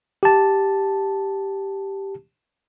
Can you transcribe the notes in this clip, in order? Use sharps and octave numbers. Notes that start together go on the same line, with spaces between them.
G4 A5